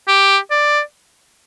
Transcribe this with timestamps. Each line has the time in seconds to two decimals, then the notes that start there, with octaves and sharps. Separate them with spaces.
0.08 G4
0.50 D5